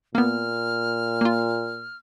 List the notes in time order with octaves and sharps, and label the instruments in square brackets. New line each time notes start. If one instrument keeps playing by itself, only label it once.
[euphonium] A#2 [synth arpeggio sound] A#3 B3 [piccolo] F6
[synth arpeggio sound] A#3 F4